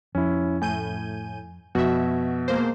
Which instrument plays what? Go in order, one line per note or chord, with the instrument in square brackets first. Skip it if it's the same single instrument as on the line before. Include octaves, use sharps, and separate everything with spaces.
[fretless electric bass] F2 [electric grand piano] C#4 E4
[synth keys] A2 G6 D#7 [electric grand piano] G#5
[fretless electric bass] F2 [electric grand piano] B2 [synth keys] F#4 E5
[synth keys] G#3 A#3 C5